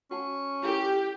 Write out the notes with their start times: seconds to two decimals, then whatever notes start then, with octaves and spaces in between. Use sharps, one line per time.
0.11 C#4 F#4 F#5 A5
0.63 E4 G4 A4 A#4